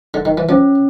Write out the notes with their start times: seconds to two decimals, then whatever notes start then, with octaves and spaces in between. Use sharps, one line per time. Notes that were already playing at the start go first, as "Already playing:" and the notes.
0.14 D3
0.25 D#3
0.37 E3
0.49 F3 C#4